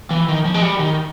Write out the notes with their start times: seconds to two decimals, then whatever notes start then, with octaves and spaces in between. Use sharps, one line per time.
0.10 E3
0.28 D#3
0.45 F3
0.54 G#3
0.62 G3
0.79 D#3